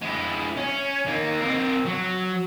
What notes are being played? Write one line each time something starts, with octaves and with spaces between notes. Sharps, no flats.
G#3 E4
C#4
A#3 D#4
C4 A#4
F#3